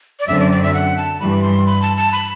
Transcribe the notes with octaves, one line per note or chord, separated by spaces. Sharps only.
D5
F#2 D3 F#3 C4 E5
D5
D5
E5
F#5
A5
G2 E3 G3 B5
C6
B5
A5
A5
B5